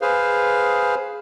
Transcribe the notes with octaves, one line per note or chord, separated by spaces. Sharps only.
G#4 B4 C5 F5